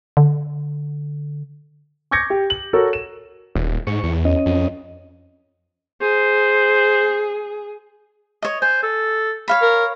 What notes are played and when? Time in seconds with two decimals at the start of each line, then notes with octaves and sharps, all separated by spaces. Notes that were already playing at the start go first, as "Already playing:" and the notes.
0.17 D3
2.11 C#6 D6 G6 G#6 A#6 C#7
2.30 G4
2.50 F#7
2.73 F#4 A4 A#4 C#5
2.93 E7
3.55 D#1
3.87 G#2 C#6
4.03 E2
4.25 C#4 D#5
4.46 F2
6.01 G#4 C5
8.42 C#5 D#5
8.62 C5 G#5
8.83 A4
9.48 C#5 F5 B5
9.62 A#4